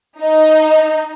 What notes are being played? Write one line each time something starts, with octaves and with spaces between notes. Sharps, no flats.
D#4 D#5